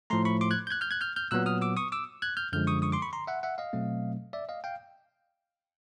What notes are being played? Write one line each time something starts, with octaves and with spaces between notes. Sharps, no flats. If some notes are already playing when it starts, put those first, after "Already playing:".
A2 F3 A3 A#5 C6
B5 C#6
C6 D6
F#6 G#6
G6
F#6 G#6
F6 G6
F#6 G#6
F6 G6
F6 G6
A#2 F#3 B3 E6 F#6
D#6 F6
D6 E6
C#6 D#6
D6 E6
F#6 G#6
F6 G6
F#2 D3 F3 G#3 F6 G6
C#6 D#6
C#6 D#6
C6 D6
B5 C#6
A#5 C6
E5 F#5
E5 F#5
D#5 F5
B2 F#3 A3 C4
D5 E5
D#5 F5
F5 G5